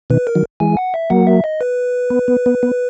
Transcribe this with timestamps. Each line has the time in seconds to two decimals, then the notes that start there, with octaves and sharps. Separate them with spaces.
0.10 B2 D#3 B4
0.27 A#4
0.35 D#3 F#3
0.60 E3 G#3 G#5
0.77 F#5
0.94 E5
1.10 F#3 A#3 F#5
1.27 E5
1.44 D#5
1.61 B4
2.10 B3
2.28 B3
2.46 B3
2.63 B3